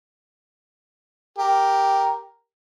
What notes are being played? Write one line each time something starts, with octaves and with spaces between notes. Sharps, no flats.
G4 A#4